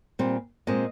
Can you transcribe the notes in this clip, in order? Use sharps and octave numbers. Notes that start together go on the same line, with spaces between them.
A#2 G3 C4
A#2 G#3 C4 D#5